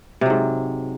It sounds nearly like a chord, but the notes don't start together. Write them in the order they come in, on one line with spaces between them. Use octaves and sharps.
C3 F#3 G#2